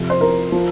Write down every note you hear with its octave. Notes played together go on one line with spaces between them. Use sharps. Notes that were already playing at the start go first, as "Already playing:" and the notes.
Already playing: F2 C3 F3
C5
A#4
F3